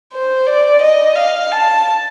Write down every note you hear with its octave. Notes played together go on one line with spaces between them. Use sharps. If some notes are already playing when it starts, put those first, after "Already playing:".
C5
D5
D#5
F5
A5